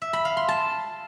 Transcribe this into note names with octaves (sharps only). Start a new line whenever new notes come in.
E5
B5
F5
C6
A5